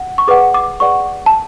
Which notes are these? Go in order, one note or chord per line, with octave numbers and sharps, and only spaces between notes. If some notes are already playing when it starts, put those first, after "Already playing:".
Already playing: F#5
C#6
G#4 B4 D5 F#5 D6
D6
G#4 B4 D5 F#5 C#6
A5